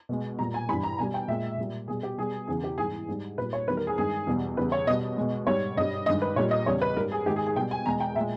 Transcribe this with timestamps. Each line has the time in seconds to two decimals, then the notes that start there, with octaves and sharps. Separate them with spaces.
0.09 B2 G#3
0.39 A#2 G3 A#5
0.54 G#5
0.69 G2 E3 G3 B5
0.83 A#5
0.99 B2 G3 G#5
1.14 G5
1.28 A#2 G#3 E5
1.58 A#2 G3
1.88 B2 G3 G#4
2.03 G4
2.18 B2 G3 G#4
2.48 E2 C#3 E3 G#4
2.64 G4
2.78 G#2 E3 G3 G#4
3.08 G#2 G3
3.38 A#2 G3 B4
3.53 C#5
3.68 E2 D#3 G3 B4
3.77 A#4
3.87 G#4
3.98 G2 D#3 G#3 G#4
4.27 E2 B2 G3
4.57 E2 C#3 G3 B4
4.72 C#5
4.87 B2 D#5
4.90 G3
5.17 B2 G#3
5.47 G#2 G3 C#5
5.77 G2 G3 D#5
6.06 G2 D#3 G#3 D#5
6.22 B4
6.36 A#2 G3 C#5
6.51 D#5
6.66 E2 C#3 G3 C#5
6.82 B4
6.97 G#2 G3 A#4
7.12 G#4
7.26 G#2 D#3 G#3 G4
7.36 G#4
7.47 G#4
7.56 B2 G5
7.59 G3
7.71 G#5
7.86 E2 B2 G#3 A#5
8.00 G5
8.16 A#2 G#3 E5